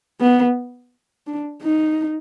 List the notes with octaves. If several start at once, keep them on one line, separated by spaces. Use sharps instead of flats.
B3
D4
D#4